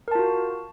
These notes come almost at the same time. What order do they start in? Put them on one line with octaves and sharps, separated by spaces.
A#4 A5 F4 F#4